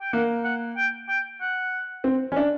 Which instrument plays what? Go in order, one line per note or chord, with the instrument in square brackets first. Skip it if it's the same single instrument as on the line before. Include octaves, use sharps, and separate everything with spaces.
[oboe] G5
[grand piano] A#3 [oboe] F#5
[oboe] F#5
G5
G5
F#5
[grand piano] C4
C#4
D4